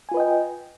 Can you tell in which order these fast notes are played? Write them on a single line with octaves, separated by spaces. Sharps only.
G#5 F4 B4 D#5 G5